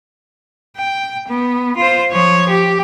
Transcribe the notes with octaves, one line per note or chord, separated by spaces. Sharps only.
G5
B3
F4 C5
F3 C#5
G4